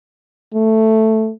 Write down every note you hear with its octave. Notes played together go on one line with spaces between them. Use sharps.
A3